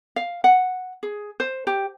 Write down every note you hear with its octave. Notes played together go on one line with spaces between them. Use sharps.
F5
F#5
G#4
C5
G4